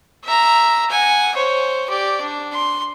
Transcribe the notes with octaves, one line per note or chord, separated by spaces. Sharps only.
E5 A#5
F#5 G#5
C5 C#5
G4 D5
D4
C6